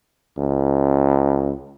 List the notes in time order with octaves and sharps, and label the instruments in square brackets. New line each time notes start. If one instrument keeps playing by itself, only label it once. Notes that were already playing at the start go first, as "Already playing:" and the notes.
[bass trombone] C#2